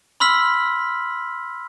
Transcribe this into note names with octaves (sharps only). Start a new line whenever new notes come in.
B5 C6 E6 F6 B6 F#7